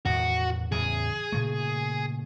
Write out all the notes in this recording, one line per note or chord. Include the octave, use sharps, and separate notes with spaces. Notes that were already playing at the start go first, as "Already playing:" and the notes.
E2 A2 D#3 F#4
E2 A2 C#3 G#4
A#2 C#3 A3